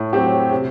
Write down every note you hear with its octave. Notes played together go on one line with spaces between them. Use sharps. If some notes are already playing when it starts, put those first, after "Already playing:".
Already playing: A2
F#3 C4 G4
C3